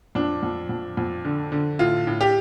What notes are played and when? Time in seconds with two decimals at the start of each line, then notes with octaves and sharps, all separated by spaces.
0.15 F2 D4
0.43 F2
0.69 F2
0.97 F2
1.25 D3
1.52 D3
1.79 A2 F4
2.07 A2
2.21 G4